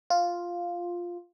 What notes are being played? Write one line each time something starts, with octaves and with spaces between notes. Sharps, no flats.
F4